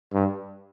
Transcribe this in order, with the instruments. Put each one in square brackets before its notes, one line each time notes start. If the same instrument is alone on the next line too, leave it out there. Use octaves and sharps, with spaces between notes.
[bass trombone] G2